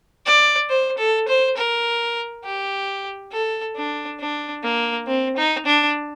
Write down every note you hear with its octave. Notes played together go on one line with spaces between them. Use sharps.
D5
C5
A4
C5
A#4
G4
A4
D4
D4
A#3
C4
D#4
D4